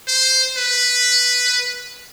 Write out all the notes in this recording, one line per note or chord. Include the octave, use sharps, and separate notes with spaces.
C5
B4